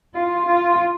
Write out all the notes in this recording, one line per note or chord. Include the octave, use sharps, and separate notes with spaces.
F4
F4